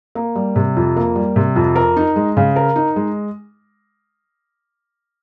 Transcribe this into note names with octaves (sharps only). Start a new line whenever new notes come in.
A#3
G3
C3
F2
A#3
G3
C3
F2
A#4
D#4
G#3
C#3
A#4
D#4
G#3